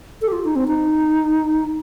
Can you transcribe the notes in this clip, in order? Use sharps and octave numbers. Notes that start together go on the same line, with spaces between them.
A4
G4
F4
D#4
C4
D#4